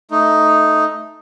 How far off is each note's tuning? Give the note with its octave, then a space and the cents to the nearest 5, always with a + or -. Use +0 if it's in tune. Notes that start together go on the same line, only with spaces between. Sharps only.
A3 +0 D#4 +0